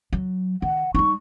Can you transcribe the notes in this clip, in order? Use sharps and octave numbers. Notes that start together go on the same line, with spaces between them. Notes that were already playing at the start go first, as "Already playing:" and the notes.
F#3
D#3 F#5
G3 D#4 C#6